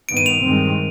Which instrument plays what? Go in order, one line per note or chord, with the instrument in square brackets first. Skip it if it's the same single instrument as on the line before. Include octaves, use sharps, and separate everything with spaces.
[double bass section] G2 D#3 B3 [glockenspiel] D7
[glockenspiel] D#7
F7
[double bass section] G2 D#3 G#3 C4